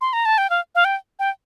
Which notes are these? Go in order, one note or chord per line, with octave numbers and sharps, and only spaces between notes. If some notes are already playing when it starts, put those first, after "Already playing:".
C6
A#5
A5
G5
F5
F5
G5
G5